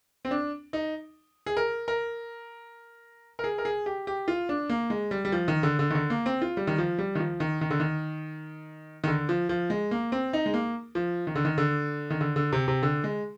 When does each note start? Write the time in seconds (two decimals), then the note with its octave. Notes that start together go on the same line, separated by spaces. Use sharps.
0.25 C4
0.31 D4
0.73 D#4
1.46 G#4
1.57 A#4
1.88 A#4
3.39 A#4
3.44 G#4
3.58 A#4
3.65 G#4
3.86 G4
4.07 G4
4.28 F4
4.49 D4
4.70 A#3
4.90 G#3
5.11 G3
5.25 G3
5.32 F3
5.48 D#3
5.63 D3
5.79 D3
5.90 D#3
5.95 D3
6.10 A#3
6.26 C4
6.42 F4
6.57 G3
6.67 D#3
6.78 F3
6.99 G3
7.15 D#3
7.19 F3
7.40 D#3
7.61 D#3
7.70 D3
7.80 D#3
9.04 D#3
9.07 D3
9.29 F3
9.49 F3
9.70 G#3
9.91 A#3
10.12 C4
10.33 D#4
10.46 G#3
10.54 A#3
10.95 F3
11.27 D#3
11.35 D3
11.45 D#3
11.58 D3
12.10 D#3
12.21 D3
12.36 D3
12.52 C3
12.68 C3
12.83 D3
13.04 G#3